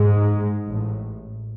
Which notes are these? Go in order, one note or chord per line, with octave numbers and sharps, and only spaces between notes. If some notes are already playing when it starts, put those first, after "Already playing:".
Already playing: G#2 G#3
A1 A2